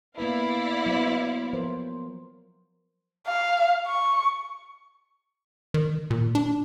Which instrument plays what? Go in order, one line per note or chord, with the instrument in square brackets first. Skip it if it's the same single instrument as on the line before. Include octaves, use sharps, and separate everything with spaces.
[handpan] A#3 B3 B4 [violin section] E4 D5 F5
[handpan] F#3 B3 C5
F3 A#4 C5
[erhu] F5
C#6
[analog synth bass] D#3
A#2
D4